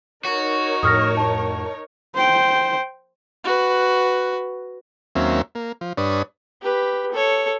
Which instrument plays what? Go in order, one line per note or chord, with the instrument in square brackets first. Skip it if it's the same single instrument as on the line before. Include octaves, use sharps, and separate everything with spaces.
[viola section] D#4 A#4 C#5 [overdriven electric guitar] F#4
[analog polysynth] F2 A2 [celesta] D#6 F6 A#6
[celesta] A5
[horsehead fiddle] C5 G5
[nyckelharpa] F#4 B4
[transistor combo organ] D#2 F#3 A#3 C4 C#4 E5
A#3
F3
G2 D4 B4 C#5 D#6
[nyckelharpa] G4 B4
A4 C#5